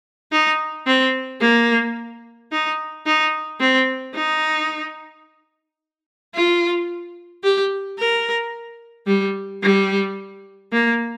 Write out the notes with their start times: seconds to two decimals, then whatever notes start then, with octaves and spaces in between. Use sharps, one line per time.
0.32 D#4
0.87 C4
1.41 A#3
2.52 D#4
3.06 D#4
3.60 C4
4.15 D#4
6.35 F4
7.44 G4
7.99 A#4
9.07 G3
9.63 G3
10.73 A#3